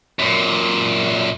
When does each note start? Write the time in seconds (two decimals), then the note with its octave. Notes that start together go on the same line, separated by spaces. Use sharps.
0.19 F#2 A#2